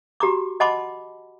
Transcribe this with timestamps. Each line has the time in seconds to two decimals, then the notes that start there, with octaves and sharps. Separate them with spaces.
0.20 F#4 G4 A#5 D6
0.60 D#5 F#5 A5 B5 C6 D6